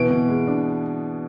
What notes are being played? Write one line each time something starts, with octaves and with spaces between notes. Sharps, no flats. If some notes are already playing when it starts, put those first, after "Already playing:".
Already playing: B2 E3 D7
B2
G#3
D4